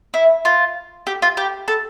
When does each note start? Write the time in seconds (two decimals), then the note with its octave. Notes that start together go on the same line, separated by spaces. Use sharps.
0.14 E4
0.45 F4
1.07 G4
1.22 F4
1.37 G4
1.68 A4